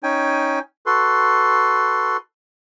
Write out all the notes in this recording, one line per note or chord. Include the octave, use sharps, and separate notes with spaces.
C#4 D#4 G5 G#5
F#4 A4 B4 C6